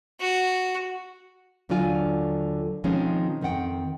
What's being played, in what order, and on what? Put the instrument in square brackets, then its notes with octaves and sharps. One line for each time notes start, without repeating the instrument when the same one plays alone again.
[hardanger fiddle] F#4
[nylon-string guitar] D#2 D3 F#3 D4 F4 G#5
B2 D#3 F3 G#3 C4 C#4
F2 D#3 C4 F#5 G5